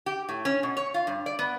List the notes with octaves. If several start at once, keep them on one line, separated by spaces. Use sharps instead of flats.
G4
A2
C#4
B2
C#5
F4
G2
D5
B3